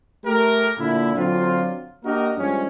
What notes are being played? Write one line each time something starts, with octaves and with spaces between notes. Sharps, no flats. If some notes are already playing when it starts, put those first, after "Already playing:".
A3 G4 A#4
A#2 D3 E4
D3 F#3 C4 D4 F4
A#3 D4 F#4 G4 A#4 D#5
G2 F3 G#3 C#4